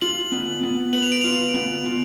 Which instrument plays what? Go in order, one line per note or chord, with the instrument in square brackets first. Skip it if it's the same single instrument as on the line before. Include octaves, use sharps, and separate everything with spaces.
[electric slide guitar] F4 [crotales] F#7
[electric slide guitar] B3
B3
[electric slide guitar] B4 [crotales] F#7
[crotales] F7
D7
[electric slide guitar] F4 [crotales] F7
[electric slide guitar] B3
F4